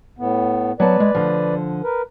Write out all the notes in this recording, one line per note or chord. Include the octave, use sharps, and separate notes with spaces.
A2 B3
F#3 B3 B4 D5 A5
G#3
D3 F3
A#4 B4